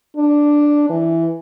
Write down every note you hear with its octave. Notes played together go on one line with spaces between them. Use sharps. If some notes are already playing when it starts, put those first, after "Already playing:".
D4
E3